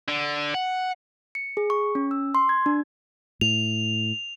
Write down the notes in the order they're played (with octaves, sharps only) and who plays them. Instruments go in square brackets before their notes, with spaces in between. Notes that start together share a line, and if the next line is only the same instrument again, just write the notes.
[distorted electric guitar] D3
F#5
[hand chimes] C#7
G#4
C#6
C#4
E6
C6
G#6
D4
[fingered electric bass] A2 [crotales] F7